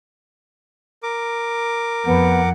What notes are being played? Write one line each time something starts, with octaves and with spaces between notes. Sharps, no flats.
A#4 D6
F2 B3 F#5